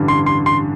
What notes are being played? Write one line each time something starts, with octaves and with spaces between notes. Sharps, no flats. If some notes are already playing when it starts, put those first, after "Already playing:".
Already playing: A1 G2 D3
C6
C6
C6